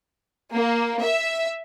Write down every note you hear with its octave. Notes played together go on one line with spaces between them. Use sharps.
A#3
E5